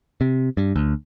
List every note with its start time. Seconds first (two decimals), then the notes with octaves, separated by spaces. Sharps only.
0.21 C3
0.57 G2
0.76 D2